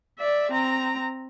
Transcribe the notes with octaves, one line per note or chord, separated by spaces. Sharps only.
D5 E5
C4 A#5